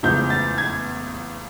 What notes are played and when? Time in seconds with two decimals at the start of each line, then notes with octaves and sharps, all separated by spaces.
0.03 F1 E2 C#3 F3 G#3 G6
0.30 A6
0.58 G#6